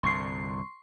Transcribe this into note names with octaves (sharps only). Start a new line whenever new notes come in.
C2 G2 D3 C6 C#6 C7